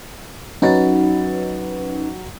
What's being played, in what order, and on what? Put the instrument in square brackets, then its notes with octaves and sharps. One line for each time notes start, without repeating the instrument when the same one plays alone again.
[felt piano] F#3 A6 [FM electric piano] C#4 D#4 B4